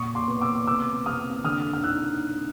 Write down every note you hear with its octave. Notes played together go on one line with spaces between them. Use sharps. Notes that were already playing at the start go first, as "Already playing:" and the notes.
Already playing: A#2 C#6 D#6
C6 D6
B3
D6 E6
C3 D6 E6
C3 D#6 F6
D3 D#6 F6
F6
D#4 E6 F#6